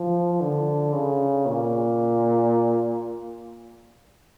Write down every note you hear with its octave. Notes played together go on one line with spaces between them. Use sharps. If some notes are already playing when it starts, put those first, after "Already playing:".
Already playing: F3
D3
C#3
A#2